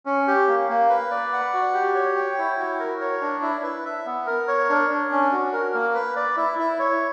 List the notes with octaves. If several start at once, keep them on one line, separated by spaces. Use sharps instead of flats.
C#4
G4
A#3
A#3
B4
D5
F#5
F#4
G4
C#5
G5
E4
F#4
A#4
C#5
D4
E4
B4
E5
B3
A#4
C#5
D4
D4
C#4
F#4
A#4
A#3
B4
D5
E4
E4
C#5